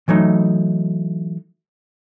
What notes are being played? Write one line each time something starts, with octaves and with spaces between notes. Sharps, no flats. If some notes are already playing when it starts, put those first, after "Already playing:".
E3 F#3 A3 D#4